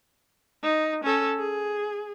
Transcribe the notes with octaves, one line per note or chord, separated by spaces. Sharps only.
D#4
C#4 A4
G#4